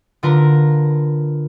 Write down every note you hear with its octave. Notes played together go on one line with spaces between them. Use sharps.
D3 F4 A#4 B4 A#5